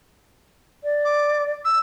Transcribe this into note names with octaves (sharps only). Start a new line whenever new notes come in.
D5
D6
E6